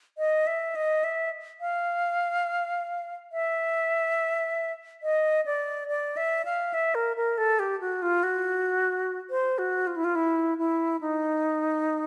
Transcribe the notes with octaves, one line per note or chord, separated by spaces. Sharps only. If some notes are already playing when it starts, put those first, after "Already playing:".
D#5
E5
D#5
E5
F5
E5
D#5
D5
D5
E5
F5
E5
A#4
A#4
A4
G4
F#4
F4
F#4
C5
F#4
F4
E4
F4
E4
E4
D#4